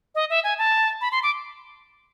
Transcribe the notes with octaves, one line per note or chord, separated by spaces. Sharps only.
D#5
E5
G#5
A5
B5
C6
D6